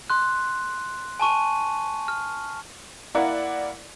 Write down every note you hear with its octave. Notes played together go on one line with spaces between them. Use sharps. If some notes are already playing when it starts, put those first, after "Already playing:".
C6 F#6
G#5 A5 C#6 D#7
F6
A#3 E4 A#4 D5 F#5